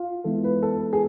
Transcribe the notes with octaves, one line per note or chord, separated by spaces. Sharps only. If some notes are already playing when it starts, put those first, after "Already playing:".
Already playing: F4
E3 G#3 B3 E4 A4
B4
A4
G#4